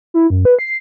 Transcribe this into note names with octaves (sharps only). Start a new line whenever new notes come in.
E4
F#2
B4
C7